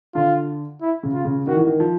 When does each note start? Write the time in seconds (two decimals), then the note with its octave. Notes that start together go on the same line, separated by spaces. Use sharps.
0.15 D3 F4
0.81 E4
1.03 C#3
1.14 F4
1.25 C#3
1.47 D#3 F#4
1.57 E3
1.66 D#3
1.80 F3